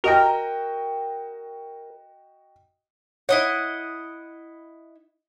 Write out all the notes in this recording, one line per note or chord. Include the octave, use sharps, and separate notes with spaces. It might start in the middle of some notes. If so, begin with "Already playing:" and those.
F#4 A#4 D#5 G5
E4 C#5 D#5 F#5